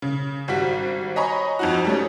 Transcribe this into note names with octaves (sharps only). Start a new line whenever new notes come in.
C#3
G#1 G3 F#4 B6
C#5 D#5 G#5 A#5 B5 C#6
F2 D#4 F#4
G3 A3 C#4